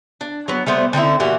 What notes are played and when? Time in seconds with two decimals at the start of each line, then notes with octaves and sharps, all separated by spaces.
0.21 D4
0.48 F#3 B3
0.66 G3 A3 B3 C5
0.93 D3 C4 D#4 E4
1.20 A#2 E3 F#4 G4